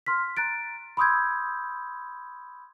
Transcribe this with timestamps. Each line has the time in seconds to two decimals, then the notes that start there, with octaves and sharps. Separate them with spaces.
0.06 C6 F6 B6
0.37 A#5 F#6 A6 D7
0.97 B5 C6 D#6 E6 G6 G#6